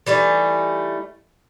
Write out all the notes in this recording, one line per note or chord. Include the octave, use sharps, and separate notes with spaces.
E3 G3 A3 D#4